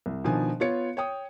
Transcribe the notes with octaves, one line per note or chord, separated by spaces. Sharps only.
C2
B2 D#3 F3 D4 G#5
B3 F4 C#5 C#7
C#5 G5 D#6